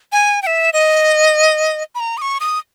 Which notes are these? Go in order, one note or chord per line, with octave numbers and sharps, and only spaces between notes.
G#5
G5
E5
D#5
B5
A#5
D#6
C#6
D#6